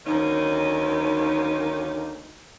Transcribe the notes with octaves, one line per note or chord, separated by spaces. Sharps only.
D2 D#3 F#3 A#3 C#4 D#4